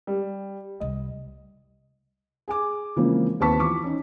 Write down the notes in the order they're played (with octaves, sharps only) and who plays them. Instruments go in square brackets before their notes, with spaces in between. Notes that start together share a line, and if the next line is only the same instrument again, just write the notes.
[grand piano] G3
[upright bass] C2 F2 [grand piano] D#5
[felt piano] G#4 G#5 D6
C#3 E3 F3 G#3 A#3 C4
D#2 C4 B4 A5 C#6 B6
E3 F3 C#6 D6
C#4 D#4